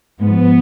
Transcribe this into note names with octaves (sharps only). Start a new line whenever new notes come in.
G#2 F3 B3